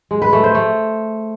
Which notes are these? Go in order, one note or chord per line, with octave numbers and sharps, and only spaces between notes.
G#3
B4
A3
C5
A3